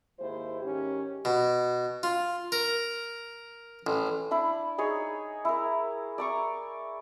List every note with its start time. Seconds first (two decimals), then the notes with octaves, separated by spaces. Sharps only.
0.20 D#2 G#2 E4 C5
0.62 G#2 D#3 C#4 G4
1.25 B2
2.03 F4
2.52 A#4
3.87 A1
4.31 D4 E4 B5
4.78 D#4 G#4 C#5
5.45 E4 A#4
6.18 D5 A#5 C#6